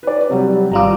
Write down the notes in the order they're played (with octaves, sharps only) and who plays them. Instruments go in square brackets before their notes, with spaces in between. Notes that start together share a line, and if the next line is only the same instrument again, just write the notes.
[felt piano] B4 D5
C3 F#3 G3
[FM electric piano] G#1 G3 F4 [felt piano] A#5 D6